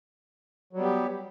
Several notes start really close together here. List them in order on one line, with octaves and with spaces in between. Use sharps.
F#3 G3 B3 G4